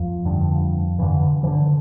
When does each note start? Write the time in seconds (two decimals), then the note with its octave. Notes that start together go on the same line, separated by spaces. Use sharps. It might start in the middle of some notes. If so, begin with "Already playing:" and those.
Already playing: F2 F3
0.25 G2 D3
0.98 G2 D3 E3
1.43 E3
1.47 D3